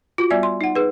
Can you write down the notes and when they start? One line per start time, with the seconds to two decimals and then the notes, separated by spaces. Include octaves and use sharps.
0.18 F4 F#4
0.30 G3 B3 D5 E5 G#5
0.43 C6
0.61 D#4 F#5
0.75 D#4 G#4 B4